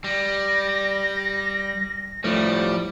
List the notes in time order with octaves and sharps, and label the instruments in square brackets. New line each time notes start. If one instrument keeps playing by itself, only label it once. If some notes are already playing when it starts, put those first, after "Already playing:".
[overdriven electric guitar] G3 [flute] A#6
[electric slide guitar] A2 F3 A3 [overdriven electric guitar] G3